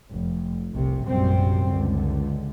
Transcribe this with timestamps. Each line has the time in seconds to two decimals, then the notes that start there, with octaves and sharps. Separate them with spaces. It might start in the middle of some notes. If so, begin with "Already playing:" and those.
0.13 F1
0.72 F1 C2 C3
1.07 A#1 F#2 C3 G3 C4
1.71 C#2 D3